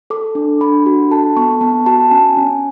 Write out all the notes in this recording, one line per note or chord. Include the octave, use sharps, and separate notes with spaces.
A4 D6
D4
D4 B5
F#4
A4 A5
B3 C#6
B3 A5
F#4 A5
C#4 G#5
C#4